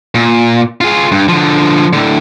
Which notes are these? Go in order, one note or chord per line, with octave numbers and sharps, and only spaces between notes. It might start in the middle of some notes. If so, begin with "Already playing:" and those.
A#2
F4 G#4
G2
D3 F3
A2 D3